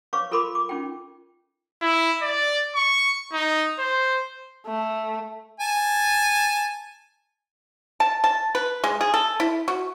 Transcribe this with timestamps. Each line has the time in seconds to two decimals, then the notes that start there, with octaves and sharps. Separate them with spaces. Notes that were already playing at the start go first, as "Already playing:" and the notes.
0.13 B4 C#5 F5 C#6 D6
0.31 F4 A4 A#4 B5 C6 D6
0.55 D6
0.69 C#4 D#4 F4 G5
1.82 E4
2.22 D5
2.75 C#6
3.33 D#4
3.79 C5
4.67 A3
5.60 G#5 A5
8.00 A5
8.24 A5
8.55 B4
8.84 G#3
9.01 G#4
9.14 A4
9.40 E4
9.68 F#4